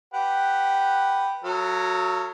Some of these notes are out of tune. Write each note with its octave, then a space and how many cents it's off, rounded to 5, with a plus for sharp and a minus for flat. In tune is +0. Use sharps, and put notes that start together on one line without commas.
G4 +0 B4 +0 F#5 +0
F#3 +0 A4 +35 F5 -35